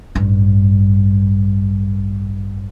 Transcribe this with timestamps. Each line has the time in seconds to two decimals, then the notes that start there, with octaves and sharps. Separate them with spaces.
0.15 A1 G2